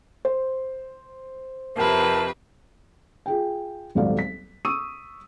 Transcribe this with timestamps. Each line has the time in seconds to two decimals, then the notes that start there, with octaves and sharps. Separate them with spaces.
0.25 C5
1.76 F2 C3 E4 A#4 B4 A5
3.26 F4 G#4 G5
3.95 D#1 G#1 F#3 A4 D5 F5
4.19 B6
4.65 C#6 D#6 E6 D#7